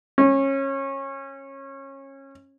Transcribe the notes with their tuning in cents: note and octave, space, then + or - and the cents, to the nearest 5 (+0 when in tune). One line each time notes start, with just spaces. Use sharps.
C#4 -25